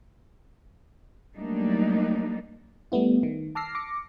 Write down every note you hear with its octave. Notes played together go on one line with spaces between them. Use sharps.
F#3 G3 A3 A#3 D4 D#4
G3 A3 B3 E4
D#3
A5 D6 E6 F6 A#6 C7
D6 A#6 C#7